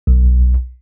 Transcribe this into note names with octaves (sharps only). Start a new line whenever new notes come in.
B1